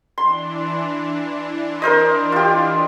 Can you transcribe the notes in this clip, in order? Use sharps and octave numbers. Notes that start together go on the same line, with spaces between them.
E3 D4 C6
A#4 C5 D#5
F4 G4